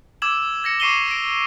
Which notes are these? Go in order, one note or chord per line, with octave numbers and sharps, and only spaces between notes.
D6 E6 G#6 E7 F#7
G#6 A#6 C#7
C#6 D6 C7 D#7 F7 G7
A#6 D7